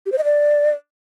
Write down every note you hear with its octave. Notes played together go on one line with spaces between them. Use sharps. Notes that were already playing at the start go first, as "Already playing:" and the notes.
G4
C5
D#5
D5